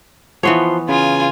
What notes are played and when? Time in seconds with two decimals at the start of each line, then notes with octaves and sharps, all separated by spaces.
0.43 E3 F3 B3 C#5 C6
0.89 C#3 F4 G#5